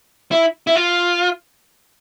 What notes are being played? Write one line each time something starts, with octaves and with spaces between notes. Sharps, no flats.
E4
E4
F4